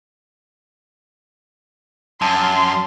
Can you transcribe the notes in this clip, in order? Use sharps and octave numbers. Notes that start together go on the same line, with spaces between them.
F#2 A5 C6